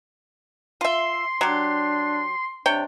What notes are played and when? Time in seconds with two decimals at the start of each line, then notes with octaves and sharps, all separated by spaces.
0.81 F4 E5 C6
1.41 F#3 D4 G4
2.66 C3 D4 C#5 G5